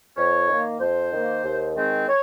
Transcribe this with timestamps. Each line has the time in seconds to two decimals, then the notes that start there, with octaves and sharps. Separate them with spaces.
0.16 F2 C#5
0.48 D#3 A#3
0.79 F2 C5
1.12 D#3 A#3
1.44 D#2
1.75 D#3 G#3 C4
2.08 C#5